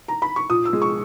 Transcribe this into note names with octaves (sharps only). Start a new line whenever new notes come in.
A#5
B5
C#6
A#2 D#6
E6
G#3
C#6